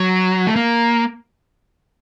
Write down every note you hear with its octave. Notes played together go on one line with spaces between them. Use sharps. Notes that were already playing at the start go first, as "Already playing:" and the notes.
Already playing: F#3
A3
A#3